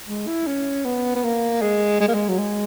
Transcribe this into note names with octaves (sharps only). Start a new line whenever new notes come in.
G#3
E4
C#4
B3
B3
A#3
G#3
G#3
A#3
G#3
F#3
G#3